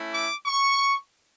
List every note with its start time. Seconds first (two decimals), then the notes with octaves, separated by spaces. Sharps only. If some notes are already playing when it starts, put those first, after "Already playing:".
Already playing: A3 C#4 E4
0.11 D6
0.46 C#6